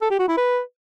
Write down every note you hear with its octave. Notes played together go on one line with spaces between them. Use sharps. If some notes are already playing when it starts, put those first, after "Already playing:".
A4
G4
F#4
E4
B4